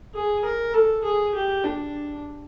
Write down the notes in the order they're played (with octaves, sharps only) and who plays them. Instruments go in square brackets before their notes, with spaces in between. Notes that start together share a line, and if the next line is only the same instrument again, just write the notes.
[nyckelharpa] G#4
A#4
A4
G#4
G4
D4